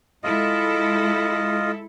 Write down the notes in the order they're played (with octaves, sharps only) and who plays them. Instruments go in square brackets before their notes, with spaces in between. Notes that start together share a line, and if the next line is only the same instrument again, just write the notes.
[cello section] G#3 E4 A4 [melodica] F4 D#5